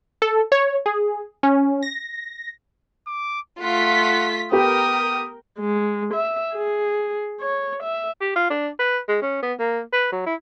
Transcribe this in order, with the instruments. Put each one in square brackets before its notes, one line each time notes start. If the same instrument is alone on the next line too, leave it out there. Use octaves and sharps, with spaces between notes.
[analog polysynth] A4
C#5
G#4
C#4
A#6
[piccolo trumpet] D6
[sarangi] A3 [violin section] F4 B6 [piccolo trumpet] F#5
[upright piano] B3 G4 A4 [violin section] A#4 [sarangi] G5 [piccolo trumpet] D#6
[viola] G#3
E5
G#4
C#5
E5
[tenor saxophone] G4
F4
D4
B4
G#3
C#4
B3
A#3
B4
F#3
E4